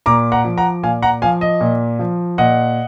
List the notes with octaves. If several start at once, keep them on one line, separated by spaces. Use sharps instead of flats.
A#2 A#5 D6
F#5 A#5
F3
F#5 A#5
A#2 F5 G#5
F#5 A#5
F3 F5 G#5
D#5
A#2
F3
A#2 D#5 F#5